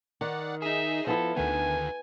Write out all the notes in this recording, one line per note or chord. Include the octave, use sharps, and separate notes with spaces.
D#3 D5 F#5
D#4 G#4 E5
F3 B3 E4 A4
D2 D3 D#3 B3 G#5